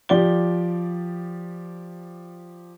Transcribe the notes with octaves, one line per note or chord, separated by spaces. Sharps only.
F3 G4 D5 G7